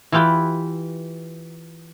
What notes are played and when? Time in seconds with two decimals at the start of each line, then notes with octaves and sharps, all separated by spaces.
0.12 E3 E4 F4 G4 B4